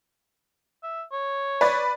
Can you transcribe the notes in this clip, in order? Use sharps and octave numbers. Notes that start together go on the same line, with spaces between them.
E5
C#5
B4 D5